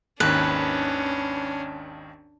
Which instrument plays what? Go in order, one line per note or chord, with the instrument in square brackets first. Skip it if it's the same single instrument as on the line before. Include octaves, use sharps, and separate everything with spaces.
[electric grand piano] G#1 D#2 D#3 [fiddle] C#4 D4 [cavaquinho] B4